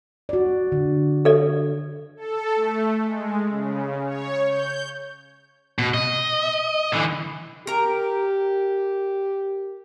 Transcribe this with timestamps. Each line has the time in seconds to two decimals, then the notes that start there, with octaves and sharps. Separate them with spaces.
0.29 F#4 D5
0.72 D3
1.25 A4 D5
2.17 A4
2.56 A3
3.03 G#3
3.48 C#3
4.06 C#5
4.47 G6
5.79 B2
5.94 D#5
6.93 D3 E3
7.67 G4 A#4 A#5